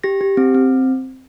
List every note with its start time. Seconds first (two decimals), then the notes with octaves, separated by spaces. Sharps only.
0.04 G4 A#6
0.21 G4
0.37 C4
0.55 C4